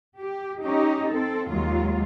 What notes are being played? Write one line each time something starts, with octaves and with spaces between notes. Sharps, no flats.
G4
C#4 D#4 G4
C4 A4
D#2 F#3 G#3 F4